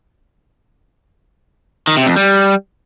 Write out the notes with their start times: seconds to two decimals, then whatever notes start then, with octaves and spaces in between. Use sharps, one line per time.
1.87 D#3
1.97 C3
2.07 F2
2.16 G3